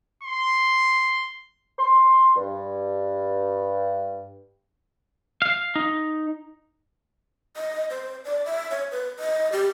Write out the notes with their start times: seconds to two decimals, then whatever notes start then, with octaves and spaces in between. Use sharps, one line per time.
0.24 C6
1.78 C6
2.35 G2
5.42 F5
5.76 D#4
7.56 D#5
7.90 C5
8.25 D5
8.46 E5
8.71 C#5
8.92 B4
9.19 D#5
9.52 G4